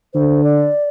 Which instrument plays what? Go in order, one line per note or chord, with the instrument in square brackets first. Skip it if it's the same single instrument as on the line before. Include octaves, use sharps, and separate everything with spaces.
[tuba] D3 [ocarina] C5
[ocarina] D5